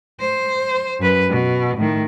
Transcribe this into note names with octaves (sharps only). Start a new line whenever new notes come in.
C5
F#2 B4
B2
A2 D#3